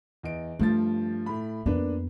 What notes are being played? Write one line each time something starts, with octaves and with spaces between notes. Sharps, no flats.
E2 D#5 D7
G2 F3 A3 A6
A2 B5
F2 A#3 B3 D4 B4